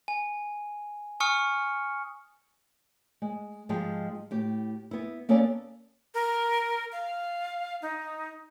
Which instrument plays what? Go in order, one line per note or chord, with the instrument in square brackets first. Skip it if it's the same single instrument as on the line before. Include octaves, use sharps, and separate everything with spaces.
[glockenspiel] G#5
G#5 C#6 D#6 F6 C#7
[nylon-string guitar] G#3
G#2 F3 G#3 G4 A5
A2 G4
B3 E4
A#3 B3 C#4 A4 C#5 D5
[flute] A#4
F5
D#4